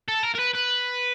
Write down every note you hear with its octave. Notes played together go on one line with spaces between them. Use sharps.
A4
A#4
A#4
B4
B4